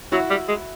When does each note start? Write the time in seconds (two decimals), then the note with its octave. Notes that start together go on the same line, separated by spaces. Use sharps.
0.12 F#3 E4 F#4
0.30 G3
0.48 G#3